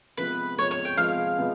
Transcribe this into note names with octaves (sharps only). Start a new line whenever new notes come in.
C3 F3 G#3 B3 B4
C3 F3 G#3 B3 C#5
C#5
G5
C3 F3 G#3 B3 F5
C3 F3 G#3 B3